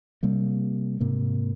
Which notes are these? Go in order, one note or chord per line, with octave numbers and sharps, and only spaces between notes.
C3 G3 A#3
G#2 C3 A#3